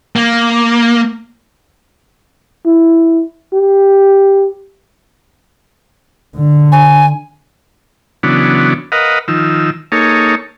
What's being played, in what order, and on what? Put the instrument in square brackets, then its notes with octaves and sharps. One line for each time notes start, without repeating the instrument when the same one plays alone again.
[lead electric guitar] A#3
[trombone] E4
G4
[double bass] D3
[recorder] G#5
[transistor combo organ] C#3 E3 F#3 B3 D4
A#4 B4 D#5 F5 F#5
D#3 F3 E6
A#3 D#4 G#4 A4 C#5